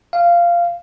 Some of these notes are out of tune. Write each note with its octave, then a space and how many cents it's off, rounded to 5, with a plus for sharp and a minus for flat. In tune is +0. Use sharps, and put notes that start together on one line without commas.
F5 -15